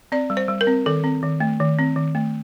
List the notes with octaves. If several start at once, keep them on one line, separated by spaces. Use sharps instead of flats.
C4 D5
G3
C5
G3
A#4
C4
D#3 A4
C4
D#3
A3
D#3
C4
D#3
A3